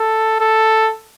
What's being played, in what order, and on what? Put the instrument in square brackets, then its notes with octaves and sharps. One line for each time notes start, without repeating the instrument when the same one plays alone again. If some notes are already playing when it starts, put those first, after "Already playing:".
Already playing: [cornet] A4
A4